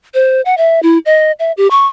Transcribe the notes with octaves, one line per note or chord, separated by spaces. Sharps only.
C5
F#5
E5
E4
D#5
E5
G4
C#6